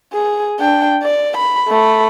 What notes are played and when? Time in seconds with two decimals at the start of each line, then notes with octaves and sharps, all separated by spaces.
0.13 G#4
0.60 D4 G5
1.03 D5
1.37 B5
1.68 A3 B5